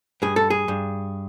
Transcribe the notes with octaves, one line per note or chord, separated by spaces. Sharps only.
G2 G#4
A4
G#4
G2